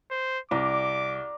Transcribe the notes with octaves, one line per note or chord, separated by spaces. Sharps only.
C5
C2 D5 A#5 D6